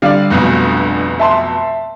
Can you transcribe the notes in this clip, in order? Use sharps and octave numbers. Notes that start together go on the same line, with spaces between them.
D3 G3 D5 F5
F1 B1 B2
E5 A5 C6